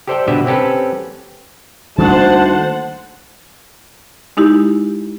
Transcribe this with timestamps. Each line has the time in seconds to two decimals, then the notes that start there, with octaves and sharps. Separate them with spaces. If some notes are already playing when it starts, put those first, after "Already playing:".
0.07 G4 A4 C5 D5 E5 G5
0.28 B2 D3 B3 G4 B4 E5
0.46 C4 C#4 G4 A4 B4
1.98 D2 D#3 G3 A#3 C5 F#5 A5
4.37 G#3 D#4 E4 G4